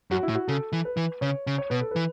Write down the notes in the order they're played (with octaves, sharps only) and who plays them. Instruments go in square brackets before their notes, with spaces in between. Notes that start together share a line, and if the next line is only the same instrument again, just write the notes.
[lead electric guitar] F#2 [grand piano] F#4
[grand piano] E4
[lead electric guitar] A2
[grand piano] F#4
[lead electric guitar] C#3 [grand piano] A4
[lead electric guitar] E3
[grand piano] B4
[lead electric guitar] E3
[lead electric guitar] C#3 [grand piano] C#5
[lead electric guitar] C#3
[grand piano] C#5
[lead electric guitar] B2 [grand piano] B4
[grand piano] A4
[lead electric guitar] E3 [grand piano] B4